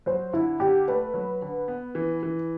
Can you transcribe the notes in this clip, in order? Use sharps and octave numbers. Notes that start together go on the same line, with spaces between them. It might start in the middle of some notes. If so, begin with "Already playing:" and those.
F#3 C5
D3 E4
D3 G4
A3 B4
F#3
D3
B3
E3
E3